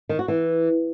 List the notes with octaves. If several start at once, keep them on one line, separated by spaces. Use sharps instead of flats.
D#3
F#4
E3